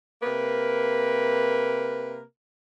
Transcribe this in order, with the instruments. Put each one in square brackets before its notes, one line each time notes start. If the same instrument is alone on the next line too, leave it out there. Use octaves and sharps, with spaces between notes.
[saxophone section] C3 A#3 A#4 B4